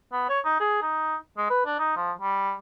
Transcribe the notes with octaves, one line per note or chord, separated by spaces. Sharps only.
B3
C#5
D#4
G#4
D#4
G#3
B4
D4
D#4
F3
G3